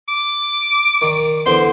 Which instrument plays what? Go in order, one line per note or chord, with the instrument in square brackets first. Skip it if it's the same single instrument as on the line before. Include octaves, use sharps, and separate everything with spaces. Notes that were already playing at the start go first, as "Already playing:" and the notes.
[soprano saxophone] D6
[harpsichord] D#3 D5
[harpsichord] E2 D3 [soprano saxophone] C5